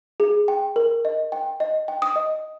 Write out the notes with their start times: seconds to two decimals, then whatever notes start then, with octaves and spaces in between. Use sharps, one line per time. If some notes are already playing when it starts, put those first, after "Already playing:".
0.20 G#4
0.48 G5
0.76 A#4
1.05 D#5
1.32 G5
1.60 D#5
1.88 G5
2.02 D#6
2.16 D#5